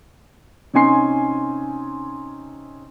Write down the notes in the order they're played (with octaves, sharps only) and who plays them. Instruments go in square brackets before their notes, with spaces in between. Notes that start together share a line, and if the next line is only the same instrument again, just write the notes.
[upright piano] C3 C#4 D#4 G#5 C6 C7